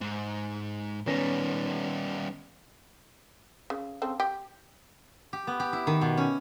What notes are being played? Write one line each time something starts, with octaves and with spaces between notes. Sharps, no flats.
G#2
D#3 G3 B3 C#4 A#6
C#3
C#3 C4 A4
G4
G4
B3
G4
E4
D#3
B2
C#4